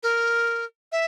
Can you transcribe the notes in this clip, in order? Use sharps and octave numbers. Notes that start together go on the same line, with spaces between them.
A#4
E5